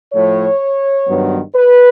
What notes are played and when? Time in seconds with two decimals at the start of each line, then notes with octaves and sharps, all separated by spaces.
0.13 A2 F3 A3 C#5
1.07 G2 D#3 F#3 B3
1.54 B4